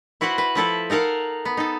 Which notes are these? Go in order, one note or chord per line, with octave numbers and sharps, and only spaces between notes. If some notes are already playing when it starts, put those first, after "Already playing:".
E4 F#4 B4 C5 F#5
B4
F3 E4 A4 B4
D#4 A4 A#4 F5 F#5
B3
D#4 A4